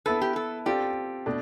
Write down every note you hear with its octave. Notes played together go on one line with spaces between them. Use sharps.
B3 E4 A4 B4
G4
A4
C4 F4 G4 A4 D5
B2 A3 D4